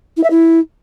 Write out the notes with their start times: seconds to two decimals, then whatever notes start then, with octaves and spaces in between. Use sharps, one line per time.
0.16 E4
0.23 E5
0.30 E4